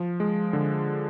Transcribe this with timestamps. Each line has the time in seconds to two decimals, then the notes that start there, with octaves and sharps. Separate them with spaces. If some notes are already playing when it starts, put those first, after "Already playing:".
Already playing: F3
0.20 G#3
0.53 D3